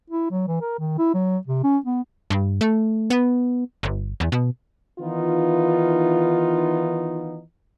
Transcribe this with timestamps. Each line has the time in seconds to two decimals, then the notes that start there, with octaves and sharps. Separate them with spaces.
0.10 E4
0.31 F#3
0.48 E3
0.61 A#4
0.79 D#3
0.98 E4
1.14 F#3
1.47 C3
1.64 C#4
1.86 B3
2.30 G2
2.61 A3
3.10 B3
3.83 G1
4.20 E2
4.32 B2
4.99 D#3 E3 B3 D#4 F4